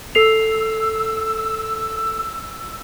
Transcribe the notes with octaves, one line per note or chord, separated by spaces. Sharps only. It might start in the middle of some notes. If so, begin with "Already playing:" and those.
A4 E6 C7 F7